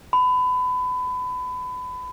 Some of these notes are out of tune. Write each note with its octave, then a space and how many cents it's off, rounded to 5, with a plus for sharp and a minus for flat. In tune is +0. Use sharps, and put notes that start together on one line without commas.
B5 +25